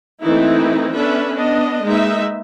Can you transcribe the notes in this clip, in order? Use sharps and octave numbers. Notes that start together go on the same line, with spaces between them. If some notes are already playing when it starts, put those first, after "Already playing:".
E3 A3 A#3 C4 D#4 E4
B3 C#4 D4 A4 B4 E5
B3 D4 D#5
G#3 A#3 D#4 B4 E5